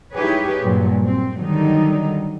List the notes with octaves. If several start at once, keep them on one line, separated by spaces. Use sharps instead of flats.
D#4 E4 G4 G#4 B4 C#5
G2 A#2 F#3
C4
D3 D#3 F#3 G3 D#4